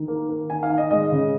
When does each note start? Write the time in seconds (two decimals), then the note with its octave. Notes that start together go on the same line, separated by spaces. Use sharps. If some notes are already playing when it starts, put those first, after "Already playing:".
Already playing: D#3
0.08 A#3
0.29 A#3
0.50 D#3 G#5
0.63 F5
0.70 D#3
0.78 D#5
0.91 G#3 D#5
1.12 C#3